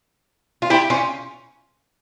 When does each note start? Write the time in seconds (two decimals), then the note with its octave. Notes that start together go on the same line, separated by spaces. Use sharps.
0.62 F4
0.70 E4 G4
0.90 C#4 F4